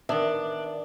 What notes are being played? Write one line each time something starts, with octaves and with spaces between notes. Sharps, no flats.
D#3 B3 D4 E5